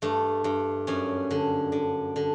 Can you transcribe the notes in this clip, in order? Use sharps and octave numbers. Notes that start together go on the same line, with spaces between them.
G2 A3
G2
F#2 C#4
D3
D3
D3